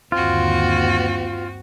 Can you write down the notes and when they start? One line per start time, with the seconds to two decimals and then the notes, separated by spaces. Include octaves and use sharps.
0.12 G1 D#2 C4 F4 F#4